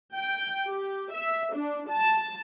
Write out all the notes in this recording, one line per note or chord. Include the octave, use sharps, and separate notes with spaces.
G5
G4
E5
D4
A5